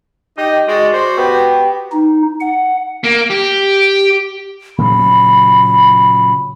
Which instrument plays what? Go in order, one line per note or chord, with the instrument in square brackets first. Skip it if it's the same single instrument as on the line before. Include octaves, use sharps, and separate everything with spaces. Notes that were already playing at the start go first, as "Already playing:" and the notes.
[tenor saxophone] D#4 [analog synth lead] G4 [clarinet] D#5
[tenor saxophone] G#3 [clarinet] F#4 [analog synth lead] D5
[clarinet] F#4 [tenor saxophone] C5
[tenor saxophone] B3 [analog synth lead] G4
[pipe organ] D#4
F#5
[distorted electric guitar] A#3
G4
[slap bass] A#2 C#3 F#3 [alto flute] B5